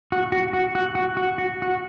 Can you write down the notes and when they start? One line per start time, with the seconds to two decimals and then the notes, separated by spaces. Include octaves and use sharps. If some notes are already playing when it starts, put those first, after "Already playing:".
0.12 F#4
0.32 F#4
0.53 F#4
0.75 F#4
0.95 F#4
1.17 F#4
1.38 F#4
1.62 F#4